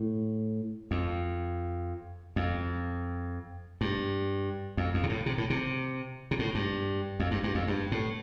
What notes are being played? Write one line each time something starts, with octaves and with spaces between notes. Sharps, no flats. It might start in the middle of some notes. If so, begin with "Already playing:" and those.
Already playing: A2
F2
F2
G2
F2
F2
C3
A2
C3
A2
C3
C3
A2
G2
F2
G2
G2
F2
G2
A2